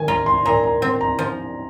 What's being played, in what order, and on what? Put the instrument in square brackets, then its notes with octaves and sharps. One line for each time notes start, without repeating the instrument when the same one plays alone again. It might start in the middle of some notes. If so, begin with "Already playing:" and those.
Already playing: [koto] D#3 [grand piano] G#5
[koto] F4 [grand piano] A#5
[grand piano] C6
[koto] A#2 [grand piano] A#5
[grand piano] A#5
[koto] C4
[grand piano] A#5
[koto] F3